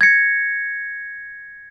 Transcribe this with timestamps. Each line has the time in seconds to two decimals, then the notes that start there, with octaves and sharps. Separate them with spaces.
0.01 G#6 A#6 C#7